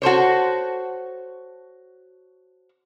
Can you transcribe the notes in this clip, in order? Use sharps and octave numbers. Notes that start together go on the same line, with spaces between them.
F#4 A4 C5 C#5